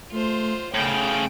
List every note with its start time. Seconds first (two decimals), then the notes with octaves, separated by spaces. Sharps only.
0.12 A3 F4 C5
0.74 A2 C#3 G5 G6 D7